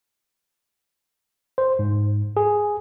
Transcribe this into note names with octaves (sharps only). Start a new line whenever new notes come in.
C5
G#2
G#4